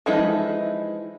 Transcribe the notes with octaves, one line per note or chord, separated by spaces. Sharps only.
E3 F3 G#3 D#4 E4